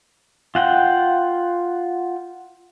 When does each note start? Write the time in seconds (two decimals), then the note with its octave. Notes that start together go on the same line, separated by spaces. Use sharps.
0.55 F4 F#5 G5